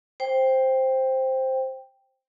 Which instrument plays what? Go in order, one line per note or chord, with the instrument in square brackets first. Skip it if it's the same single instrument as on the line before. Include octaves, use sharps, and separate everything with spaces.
[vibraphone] C5 G5